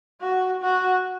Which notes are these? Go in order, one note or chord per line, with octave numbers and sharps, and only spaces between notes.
F#4
F#4